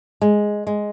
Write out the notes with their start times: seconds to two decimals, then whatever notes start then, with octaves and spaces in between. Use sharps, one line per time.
0.22 G#3
0.67 G#3